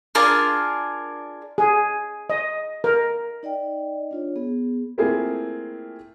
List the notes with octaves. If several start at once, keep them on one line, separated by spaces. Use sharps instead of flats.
D4 F4 G#4 A#4
G#4
D#5
A#4
D#4 D5 D#5 G5
D4 F4 C#5
B3 G#4
A3 A#3 C4 E4 F4 G#4